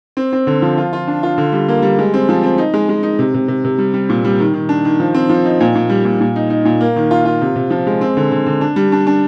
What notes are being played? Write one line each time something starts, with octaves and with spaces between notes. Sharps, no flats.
C4
C4
D3
F3
F4
F4
D4
F4
D3
G3
A#3
G3
G#3
C4
F3
C4
D#4
G#3
G#3
D#4
C3
C3
C3
C3
G3
G3
A#2
G3
D#3
D#3
D4
D#3
F3
C4
F3
D#4
A#2
A#2
G3
A#2
A#2
D#4
D#4
A#2
A#3
D#3
F4
F4
C3
C3
F3
G#3
C4
D3
D3
D3
D4
G3
D4
D4